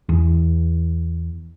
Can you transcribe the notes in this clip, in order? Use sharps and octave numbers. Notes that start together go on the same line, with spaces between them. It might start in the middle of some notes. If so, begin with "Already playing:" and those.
E2